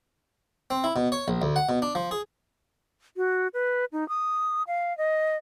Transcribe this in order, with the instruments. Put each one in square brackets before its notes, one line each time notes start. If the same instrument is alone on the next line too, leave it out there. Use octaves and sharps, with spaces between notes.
[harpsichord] C4
E4
B2
C#5
A#1
D2
F#5
B2
D4
F3
G#4
[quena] F#4
B4
D#4
D#6
F5
D#5